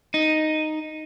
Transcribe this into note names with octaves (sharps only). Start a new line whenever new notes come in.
D#4